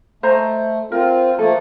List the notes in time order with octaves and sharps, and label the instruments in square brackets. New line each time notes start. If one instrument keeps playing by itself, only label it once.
[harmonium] A3 [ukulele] C5 D#5 A#5
[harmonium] C4 F4 [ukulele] A#4
[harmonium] F3 A3 A#3 [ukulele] A4